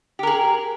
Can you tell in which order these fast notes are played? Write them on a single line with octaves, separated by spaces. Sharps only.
G4 A#4 G#4